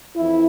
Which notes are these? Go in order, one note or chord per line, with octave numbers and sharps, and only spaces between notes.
F2 E3 E4